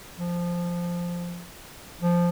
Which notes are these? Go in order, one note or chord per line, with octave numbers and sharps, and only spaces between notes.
F3
F3